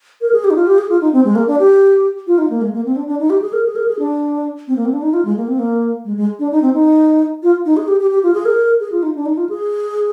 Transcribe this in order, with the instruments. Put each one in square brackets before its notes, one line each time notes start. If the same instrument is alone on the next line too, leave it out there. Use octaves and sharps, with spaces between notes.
[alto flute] A#4
G#4
G4
D#4
F4
G4
G#4
F4
D#4
C4
G#3
A#3
D4
G4
F4
D#4
A#3
G#3
A#3
C4
D4
D4
D#4
G4
G#4
A#4
G#4
A#4
G#4
D4
C4
A#3
C4
D4
D#4
F4
G#3
A#3
C4
A#3
G#3
G#3
D4
D#4
C4
D#4
F4
D#4
G#4
G4
G4
G4
F4
G#4
A#4
G#4
F4
D#4
D4
D#4
F4
G#4